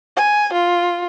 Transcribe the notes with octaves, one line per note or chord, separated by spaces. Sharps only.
G#5
F4